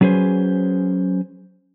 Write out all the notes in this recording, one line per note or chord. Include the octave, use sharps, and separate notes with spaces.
F#3 C#4 G#4 B4 C5